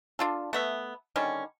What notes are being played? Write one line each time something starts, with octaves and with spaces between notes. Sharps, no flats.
D4 F4 A4
A3 B3 E5
D3 D#3 G3 C#4